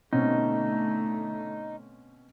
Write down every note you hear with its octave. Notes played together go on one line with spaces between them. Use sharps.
B2 D3 A3 C4 C#4 D#4